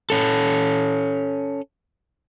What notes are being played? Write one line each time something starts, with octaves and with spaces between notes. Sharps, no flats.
C#4 A4